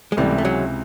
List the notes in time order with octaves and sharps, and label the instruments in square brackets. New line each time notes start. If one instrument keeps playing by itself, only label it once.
[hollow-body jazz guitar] G#3
[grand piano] C#2 C3 E3 [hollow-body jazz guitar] G3 A3
[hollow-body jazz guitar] A3
F#3 G#3